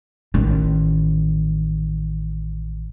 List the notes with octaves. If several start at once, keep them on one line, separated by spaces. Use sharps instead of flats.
A1 D#3